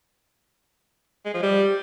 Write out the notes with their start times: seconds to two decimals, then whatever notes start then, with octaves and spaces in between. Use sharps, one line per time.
1.25 G#3
1.34 F3
1.43 G3